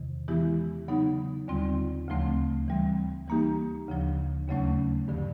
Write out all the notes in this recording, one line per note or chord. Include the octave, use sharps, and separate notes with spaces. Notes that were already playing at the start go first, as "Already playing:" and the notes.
Already playing: E2 C3 D#3
E3 G#3 B3 E4 G4
C#3 F#3 B3 D#4
D#2 D3 G3 C4 F4
D2 C#3 F3 A3 C4
E3 G3 C4
E3 G3 A#3 D#4 G4
D2 C#3 F3
D#2 C#3 F#3 A3 C#4
G2 D3 F3